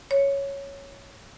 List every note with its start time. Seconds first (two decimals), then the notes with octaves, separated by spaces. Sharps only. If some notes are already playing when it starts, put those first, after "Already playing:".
0.11 C#5